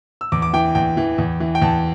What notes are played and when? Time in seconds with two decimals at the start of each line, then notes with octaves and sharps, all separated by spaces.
0.21 E6
0.32 E2 D6
0.42 D6
0.53 E3 G5
0.75 E2 G5
0.97 E3
1.18 E2
1.40 E3
1.55 G5
1.62 E2 A5